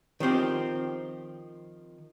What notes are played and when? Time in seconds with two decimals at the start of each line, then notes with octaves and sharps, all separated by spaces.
0.20 D#3 F3 C4 G4